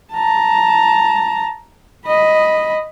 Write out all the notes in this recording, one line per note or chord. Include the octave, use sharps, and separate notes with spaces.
A5 A#5
D#5 B5